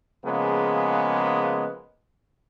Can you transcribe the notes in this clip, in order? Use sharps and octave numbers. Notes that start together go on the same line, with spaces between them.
C#3 F3 G#3 A#3 B3